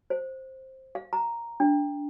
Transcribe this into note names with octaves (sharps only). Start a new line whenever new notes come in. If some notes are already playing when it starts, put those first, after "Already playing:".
C5
F5
A#5
D4